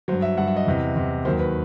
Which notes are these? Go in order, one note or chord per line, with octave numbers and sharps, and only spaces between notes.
G2 F#3 C5
E5
G2 F#3 F#5
E5
D#5
E2 C3 E3
E2 C3 E3
D#2 D#3 F#3 C5
B4